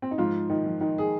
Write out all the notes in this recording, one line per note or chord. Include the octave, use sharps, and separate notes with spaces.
C4
D#4
G#2 F3 F4
D#3 D#4
F3
D#3 D#4
G#4